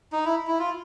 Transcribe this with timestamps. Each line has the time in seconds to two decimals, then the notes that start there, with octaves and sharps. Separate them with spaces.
0.12 D#4
0.25 E4
0.47 E4
0.59 F4